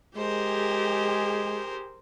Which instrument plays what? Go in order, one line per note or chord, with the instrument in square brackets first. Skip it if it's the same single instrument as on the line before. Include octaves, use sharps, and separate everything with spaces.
[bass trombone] G#3 [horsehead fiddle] G4 G#4 [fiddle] A#4 C5